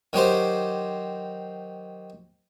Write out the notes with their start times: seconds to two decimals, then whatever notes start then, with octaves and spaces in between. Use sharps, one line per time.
0.13 D#3 F#3 G4 C5